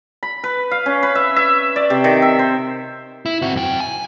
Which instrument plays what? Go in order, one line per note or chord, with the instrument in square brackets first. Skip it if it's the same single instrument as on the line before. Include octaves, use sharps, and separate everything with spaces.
[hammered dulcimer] B5
B4
F5
C#4
B4
E5
E5
D5
C3
D#3
E5
C5
[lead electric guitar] E4
C4 F#4
F#2 G5
G#5